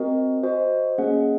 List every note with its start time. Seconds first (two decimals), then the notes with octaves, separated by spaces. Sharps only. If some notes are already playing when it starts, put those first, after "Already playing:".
Already playing: C4 F#4 A#4 D#5
0.43 F#4 C5 D#5 G#5
0.98 A#3 C#4 G#4 D#5 F#5